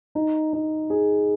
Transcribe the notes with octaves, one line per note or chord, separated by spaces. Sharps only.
D#4
D#4
G#4